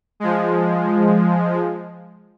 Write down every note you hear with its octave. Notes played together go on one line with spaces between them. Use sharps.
F3 G#3